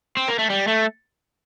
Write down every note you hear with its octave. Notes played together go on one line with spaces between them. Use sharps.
C4
A#3
A3
G3
A3